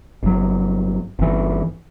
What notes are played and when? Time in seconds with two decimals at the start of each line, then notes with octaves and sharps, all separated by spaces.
0.23 G1 F#3
1.19 G1 E3